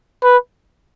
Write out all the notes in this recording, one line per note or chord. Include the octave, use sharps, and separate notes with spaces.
B4